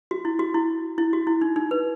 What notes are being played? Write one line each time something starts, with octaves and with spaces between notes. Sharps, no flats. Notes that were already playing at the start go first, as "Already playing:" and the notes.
F#4
E4
F#4
E4
E4
F#4
E4
D#4
D#4
B4